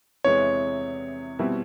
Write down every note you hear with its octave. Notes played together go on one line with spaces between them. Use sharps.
E2 C3 E3 G#3 C#5
B2 G3 C4 E4